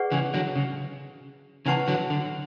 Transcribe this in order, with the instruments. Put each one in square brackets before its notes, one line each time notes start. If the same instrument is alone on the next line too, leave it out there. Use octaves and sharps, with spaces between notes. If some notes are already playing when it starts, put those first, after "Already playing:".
Already playing: [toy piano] G#4 B4 D5 F#5 C#6
[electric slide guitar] C#3 E3
D3 F#3
C#3
[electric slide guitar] C#3 E3 [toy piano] E4 B4 F#5 A5 C#6
[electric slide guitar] D3 F#3
D3